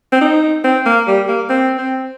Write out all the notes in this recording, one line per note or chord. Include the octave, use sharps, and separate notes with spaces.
C4
D#4
C4
A#3
G3
A#3
C4
C4